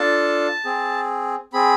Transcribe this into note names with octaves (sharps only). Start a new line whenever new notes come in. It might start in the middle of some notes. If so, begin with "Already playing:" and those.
Already playing: D4 F4 A4 A5
C4 G#4
C4 G#4 B5